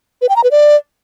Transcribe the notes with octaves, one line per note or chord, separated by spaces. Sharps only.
B4
G5
A#5
B4
D5